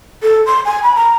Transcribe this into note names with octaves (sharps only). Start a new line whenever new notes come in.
A4
C6
G#5
B5
A#5